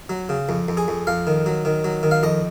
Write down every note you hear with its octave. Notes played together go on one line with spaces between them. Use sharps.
F#3
C#3
F2
F2
G#4
F2
F2 F5
D#3
F#3
D#3
F#3
D#3
F5
F2 D#5